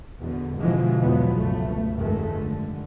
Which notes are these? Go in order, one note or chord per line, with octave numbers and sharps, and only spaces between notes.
E2 B2 D3
G#2 B2 D3 E3 F3 G#3
E2 G#2 B2 F3 F#3 B3
G1 C#2 A3
F1 G2 D#3 G#3 A3
D3